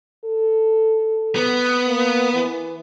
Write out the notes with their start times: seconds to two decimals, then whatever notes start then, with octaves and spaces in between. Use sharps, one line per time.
0.25 A4
1.36 B3
1.86 A#3
2.34 E3